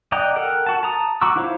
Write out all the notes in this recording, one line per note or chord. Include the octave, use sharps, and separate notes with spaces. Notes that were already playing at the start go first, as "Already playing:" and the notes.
D5 D#5 F#5 G5 A#5
A4 A#4 F#5 G5
F#4 A5
A5 A#5 D#6
F#4 A#5 C#6 D6 E6
E4 F4 C5 C#5 F5